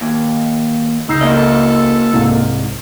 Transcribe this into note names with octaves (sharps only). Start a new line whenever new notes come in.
D#2
C#2 D#4 E6 C7
C#3 A#3 D#5
A4
C2 G#2 F5